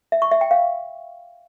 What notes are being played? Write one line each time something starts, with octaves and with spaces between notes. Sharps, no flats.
E5
C#6
E5
G5
F5